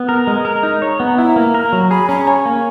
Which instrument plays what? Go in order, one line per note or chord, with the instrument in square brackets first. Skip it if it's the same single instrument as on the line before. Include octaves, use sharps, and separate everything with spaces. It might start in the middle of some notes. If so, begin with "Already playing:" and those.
Already playing: [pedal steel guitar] B3
[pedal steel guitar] A#4 [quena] A#5
[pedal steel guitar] G#3 [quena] A#5
[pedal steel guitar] A#4
D#4
C#5
B3
[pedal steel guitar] E4 [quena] A#5
[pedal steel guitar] A#3
A#4
F#3
[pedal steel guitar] G#4 [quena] B5
[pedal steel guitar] C#4 [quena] A#5
[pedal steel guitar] C#5 [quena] G#5
[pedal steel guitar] A#3